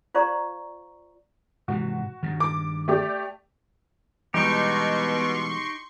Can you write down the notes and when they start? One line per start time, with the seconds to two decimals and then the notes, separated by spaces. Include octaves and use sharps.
0.14 F4 C5 D5 F5 A#5 C#6
1.68 G#2 C3 E3 F#4
2.23 G2 D#3
2.40 D6
2.88 A3 G4 D5
4.34 B2 E3 G3 G#3 D#4 G4 C6 C#6